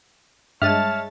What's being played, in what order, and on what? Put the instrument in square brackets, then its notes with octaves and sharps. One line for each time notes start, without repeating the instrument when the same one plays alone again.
[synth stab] G2 G#3 A6 [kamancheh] C#5 A5 [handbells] E5 [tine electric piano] F6